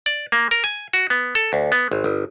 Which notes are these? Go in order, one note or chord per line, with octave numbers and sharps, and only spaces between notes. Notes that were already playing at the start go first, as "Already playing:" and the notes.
D5
A#3
A#4
G#5
F#4
B3
A4
D2
B3
G#1
G1